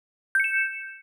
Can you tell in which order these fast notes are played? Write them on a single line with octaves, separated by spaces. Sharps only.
G6 C#7 E7